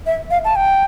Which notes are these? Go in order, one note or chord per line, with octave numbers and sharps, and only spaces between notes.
E5
F5
A5
G5